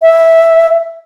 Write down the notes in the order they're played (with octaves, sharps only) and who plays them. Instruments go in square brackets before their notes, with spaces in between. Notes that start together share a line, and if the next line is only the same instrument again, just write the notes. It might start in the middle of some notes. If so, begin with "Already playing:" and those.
[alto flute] E5